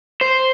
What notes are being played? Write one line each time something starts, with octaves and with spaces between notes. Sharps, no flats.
C5